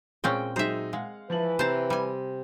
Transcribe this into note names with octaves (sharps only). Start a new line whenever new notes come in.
A#2 G#3 C4 C#4 G5 C#6
F#3 G#3 D#4 C5 E5
G#3 F5 F#5
E3 F3 B4 A5 F#7
C3 C5 A5 A#5
G3 G#5